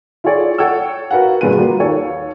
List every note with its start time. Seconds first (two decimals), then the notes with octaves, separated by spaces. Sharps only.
0.24 E4 F4 G#4 A4 C#5 D5
0.58 A4 C#5 F#5 G5 E6
1.11 F#4 A#4 B4 F5 F#5
1.41 G2 B2 G#3 F4 B4 D#7
1.57 F#3 A#3 F4 G4 B4
1.80 D#2 A4 C#5